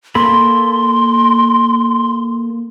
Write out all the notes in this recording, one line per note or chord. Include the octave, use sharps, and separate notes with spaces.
A#3 A4 B5 C6